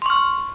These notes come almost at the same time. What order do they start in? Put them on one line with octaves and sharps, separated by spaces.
C6 C#6 F6